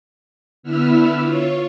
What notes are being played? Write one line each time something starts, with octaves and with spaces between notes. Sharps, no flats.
D3 B3 E4 B4 E6 F6
F4 C#5